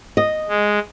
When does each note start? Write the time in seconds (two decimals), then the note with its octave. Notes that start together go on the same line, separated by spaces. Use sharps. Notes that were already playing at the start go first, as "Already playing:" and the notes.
0.17 D#5
0.48 G#3